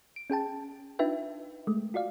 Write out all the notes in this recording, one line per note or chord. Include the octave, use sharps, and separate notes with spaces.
D7
C#4 G#4 G5 A5
D4 D#4 F4 B4 E5 G5
G#3 A3
F4 F#4 D5 F5